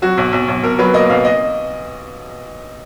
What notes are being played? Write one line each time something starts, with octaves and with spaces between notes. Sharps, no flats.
F#3 F#4
B1
B1
B1
B1 A#4
F#3 B4
A#3 D#5
B1 F5
D#5